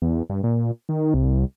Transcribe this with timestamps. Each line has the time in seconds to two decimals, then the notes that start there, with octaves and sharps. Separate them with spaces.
0.02 E2
0.30 G2
0.43 A#2
0.89 D#3
1.14 C2